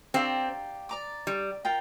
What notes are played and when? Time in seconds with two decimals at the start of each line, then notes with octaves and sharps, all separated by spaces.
0.14 C4 G4 D5 F5 A#5
0.89 D5 A#5 D6
1.27 G3
1.65 F4 A#4 G5 A#5